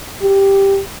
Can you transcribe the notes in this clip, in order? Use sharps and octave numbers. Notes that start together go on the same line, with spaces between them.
G4